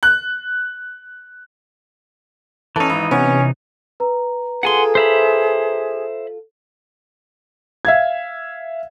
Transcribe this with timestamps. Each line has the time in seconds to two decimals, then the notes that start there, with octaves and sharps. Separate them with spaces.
0.03 F#6
2.76 E3 C#4 D#4 A4
2.90 G#1
3.11 C3 B3 C#4
4.00 B4 A#5
4.63 F4 G#4 A4 F#5 G#5 C6
4.95 C5 E5 B5
7.85 E5 F5 G#6